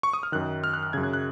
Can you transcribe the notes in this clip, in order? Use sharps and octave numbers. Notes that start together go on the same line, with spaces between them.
C#6
D#6
F6
F#2 D#3 F#6
F6
F#6
F6
F#2 C#3 G#6
F#6
F#6